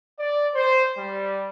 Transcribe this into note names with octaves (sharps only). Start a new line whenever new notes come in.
D5
C5
G3